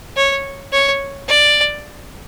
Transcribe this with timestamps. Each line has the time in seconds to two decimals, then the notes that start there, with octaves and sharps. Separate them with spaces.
0.16 C#5
0.73 C#5
1.28 D5